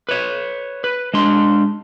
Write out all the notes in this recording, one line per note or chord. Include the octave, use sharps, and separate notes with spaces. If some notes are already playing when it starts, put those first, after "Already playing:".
B4 C#5
B4
G#3 D4 C6